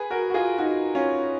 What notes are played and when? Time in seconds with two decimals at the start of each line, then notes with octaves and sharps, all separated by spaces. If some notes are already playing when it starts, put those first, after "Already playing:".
Already playing: G#4 B4
0.10 F#4 A#4
0.30 F#4
0.34 F4 G#4
0.58 D#4 F#4
0.95 C#4 F4